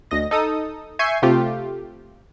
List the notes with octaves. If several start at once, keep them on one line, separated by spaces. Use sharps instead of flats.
D2 D#5 A#6
D#4 A4 D#6
E5 G#5 C#6 G6 C7 D#7
C3 A3 F4 G4